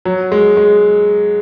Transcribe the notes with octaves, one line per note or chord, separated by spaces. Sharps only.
F#3
G#3
G#3